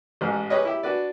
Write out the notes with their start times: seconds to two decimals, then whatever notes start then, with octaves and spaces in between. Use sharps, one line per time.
0.21 A1 G#2 F6
0.50 G4 G#4 B4 C#5 D#5
0.65 E4 G4
0.83 D4 F#4 B4 D5